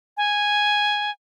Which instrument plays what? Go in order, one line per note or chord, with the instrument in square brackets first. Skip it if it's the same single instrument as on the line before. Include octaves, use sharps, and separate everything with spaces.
[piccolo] G#5